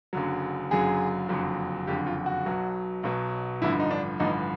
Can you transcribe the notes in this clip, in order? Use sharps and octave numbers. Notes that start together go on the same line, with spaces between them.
F#1 F#2 D3 F#3
F#1 F#2 D3 F#3 G#4
F#1 F2 D3 F#3
F#1 F2 D3 F#3 G4
F4
F#4
B1 B2 F#3
B1 B2 F#3
A1 G2 D3 F3 E4
D#4
D4
A1 G2 D3 F3 D#4